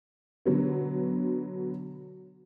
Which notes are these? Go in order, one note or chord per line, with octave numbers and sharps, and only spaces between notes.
B2 D3 F#3 B3